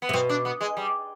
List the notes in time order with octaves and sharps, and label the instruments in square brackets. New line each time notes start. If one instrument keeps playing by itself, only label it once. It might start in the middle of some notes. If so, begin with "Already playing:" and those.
[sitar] B3
[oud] C3
[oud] B2 [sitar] C4
[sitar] D4
B3
G#3
G3